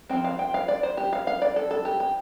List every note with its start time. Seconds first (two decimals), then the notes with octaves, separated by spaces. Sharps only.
0.09 F3 C4 G5
0.24 F5
0.39 G5
0.54 F5
0.68 D5
0.83 C5
0.97 G4
1.13 F5
1.27 F5
1.42 D5
1.56 A4
1.71 A4
1.85 G4
2.00 G4